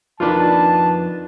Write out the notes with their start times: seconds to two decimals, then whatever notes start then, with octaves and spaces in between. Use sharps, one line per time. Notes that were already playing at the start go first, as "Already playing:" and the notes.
0.20 F2 D#3 D4 F4 B4 A5